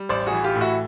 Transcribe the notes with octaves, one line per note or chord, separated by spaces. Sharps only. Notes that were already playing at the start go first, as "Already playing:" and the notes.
Already playing: G3
A1 C5 D5
F#4 G#4
E3
F4 G4
A2
E4 F#4